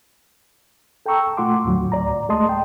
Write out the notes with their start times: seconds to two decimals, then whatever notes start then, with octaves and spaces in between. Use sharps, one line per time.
1.06 A4 G5 A5 A#5 C#6 E6
1.37 A#2 A3 F4 F#5 C6 D6
1.65 D#2 A2 D3 F#3
1.92 D2 A2 D5 A#5
2.29 G#3 A3 D#5 A5 C6 D#6
2.49 G5